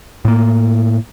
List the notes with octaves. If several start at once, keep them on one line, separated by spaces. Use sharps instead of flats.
A2 A#3